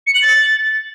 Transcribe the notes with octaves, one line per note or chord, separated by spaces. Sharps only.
C#7
F#7
A6